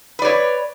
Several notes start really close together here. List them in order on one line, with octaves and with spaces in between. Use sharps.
B4 D5 C#5